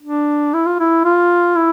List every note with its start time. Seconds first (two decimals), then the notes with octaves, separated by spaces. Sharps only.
0.03 D4
0.54 E4
0.66 F4
0.80 E4
1.05 F4
1.56 E4